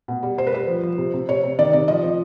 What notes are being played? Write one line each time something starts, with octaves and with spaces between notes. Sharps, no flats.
B2
G3
G3 C5
B4
G3 C5
F3
F3
C3
C3
C3 C#5
C3
D#3 D5
C3 D5
F3 D#5
F3